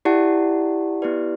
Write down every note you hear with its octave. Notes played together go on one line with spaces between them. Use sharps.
E4 G4 D5 F#5 A5
B3 E4 G4 B4 D5